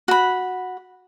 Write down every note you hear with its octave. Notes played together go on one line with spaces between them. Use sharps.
F#4 B5